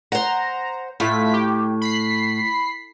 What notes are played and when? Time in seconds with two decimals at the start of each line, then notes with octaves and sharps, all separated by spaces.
0.12 C5 F#5 A#5
1.00 A2 A3 F4 B6
1.34 G4
1.82 B5 B6 C7